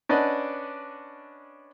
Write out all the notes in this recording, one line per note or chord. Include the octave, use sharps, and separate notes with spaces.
C#4 D4 B4 D5 D#5 F#5